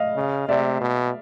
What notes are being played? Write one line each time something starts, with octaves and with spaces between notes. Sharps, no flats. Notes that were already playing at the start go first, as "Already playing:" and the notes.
Already playing: D#5 F5
C#3
C3 D5 E5
B2